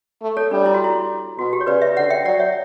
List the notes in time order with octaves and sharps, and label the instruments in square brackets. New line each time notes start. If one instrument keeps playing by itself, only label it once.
[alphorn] A3
[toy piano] A4 C#5
[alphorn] G3 [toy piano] D4
[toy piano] E4
F#4
E4
[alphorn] B2 [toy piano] F#4
[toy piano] G4
C#5
[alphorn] C#3 [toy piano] B4 D5
[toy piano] C#5 E5
[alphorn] D3 [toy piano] D5 F#5
[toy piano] E5 G5
[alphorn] F#3 [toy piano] D5 F#5
[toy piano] C#5 E5